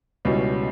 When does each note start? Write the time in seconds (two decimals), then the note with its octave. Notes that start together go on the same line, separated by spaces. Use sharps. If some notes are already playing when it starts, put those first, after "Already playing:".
0.25 C#2 B2 G3 C#4 E4